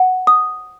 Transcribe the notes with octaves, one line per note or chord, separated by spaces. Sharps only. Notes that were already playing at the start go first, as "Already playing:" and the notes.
Already playing: F#5
D#6